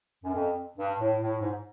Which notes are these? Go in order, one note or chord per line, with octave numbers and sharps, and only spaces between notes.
F#2
F2
G2
A2
A2
G#2